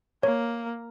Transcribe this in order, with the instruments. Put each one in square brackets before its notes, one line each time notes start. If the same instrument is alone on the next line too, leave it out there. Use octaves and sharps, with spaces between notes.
[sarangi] A#3 [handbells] C#5